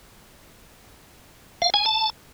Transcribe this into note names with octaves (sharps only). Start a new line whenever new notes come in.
F5
G#5
A5